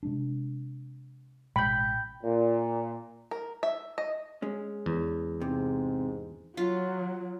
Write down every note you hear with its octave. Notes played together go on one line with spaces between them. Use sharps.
C3 G#3 D4
A1 B2 G#3 G5 B5 G6
A#2
A#4
E5
D#5
G#3 C#4
E2
G#2 C3
F#3 F4